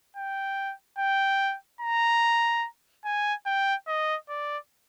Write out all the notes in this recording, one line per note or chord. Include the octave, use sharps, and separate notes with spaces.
G5
G5
A#5
G#5
G5
D#5
D5